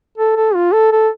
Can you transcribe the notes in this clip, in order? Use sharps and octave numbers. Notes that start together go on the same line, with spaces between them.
A4
A4
F4
A4
A4